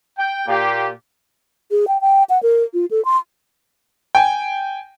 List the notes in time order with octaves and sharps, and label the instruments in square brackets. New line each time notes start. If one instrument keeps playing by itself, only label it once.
[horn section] G5
A#2 A#3 F4 G4
[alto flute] G#4
G5
G5
F#5
A#4
F4
A4
C6
[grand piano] G5 G#5